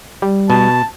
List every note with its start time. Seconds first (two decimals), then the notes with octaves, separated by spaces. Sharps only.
0.22 G3
0.50 B2 A5